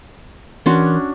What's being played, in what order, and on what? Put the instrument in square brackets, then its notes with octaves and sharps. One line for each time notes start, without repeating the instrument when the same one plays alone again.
[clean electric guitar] E3 A#4 C6 [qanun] C#4 D4 F#4